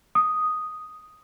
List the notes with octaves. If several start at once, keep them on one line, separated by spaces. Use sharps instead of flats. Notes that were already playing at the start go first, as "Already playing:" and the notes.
D#6